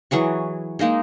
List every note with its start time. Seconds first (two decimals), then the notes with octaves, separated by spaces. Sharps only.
0.11 E3 F#3 G#4 C#6
0.79 G#3 A#3 D#4 G#4